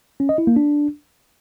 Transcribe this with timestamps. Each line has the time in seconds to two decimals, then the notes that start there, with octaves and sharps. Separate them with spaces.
0.20 C#4
0.29 D#5
0.38 E4
0.47 A#3
0.56 D4